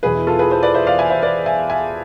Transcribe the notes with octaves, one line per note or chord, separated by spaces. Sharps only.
E2 B2 G#4 B4
E4
F4 A4
G#4 B4
A4 C5
B4 D5
C5 E5
D5 F5
E5 G#5
C5 E5
B4 D5
E5 G#5
E5 G#5